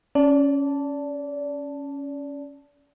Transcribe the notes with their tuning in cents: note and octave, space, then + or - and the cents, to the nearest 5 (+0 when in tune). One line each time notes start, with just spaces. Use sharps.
C#4 +5 D5 -25 A5 +0